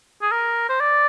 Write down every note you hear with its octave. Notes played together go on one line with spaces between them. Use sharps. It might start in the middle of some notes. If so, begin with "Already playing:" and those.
G#4
A#4
C5
D5